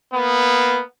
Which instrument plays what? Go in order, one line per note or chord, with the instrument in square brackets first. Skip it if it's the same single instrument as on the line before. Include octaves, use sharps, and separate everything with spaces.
[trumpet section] A#3 B3